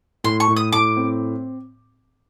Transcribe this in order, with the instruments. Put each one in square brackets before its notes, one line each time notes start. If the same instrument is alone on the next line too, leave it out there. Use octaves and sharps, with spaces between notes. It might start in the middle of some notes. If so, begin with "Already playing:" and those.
[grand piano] A2 [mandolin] C6
[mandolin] C#6
[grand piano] A2
[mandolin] D#6
[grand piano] A2 [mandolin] D6
[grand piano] C4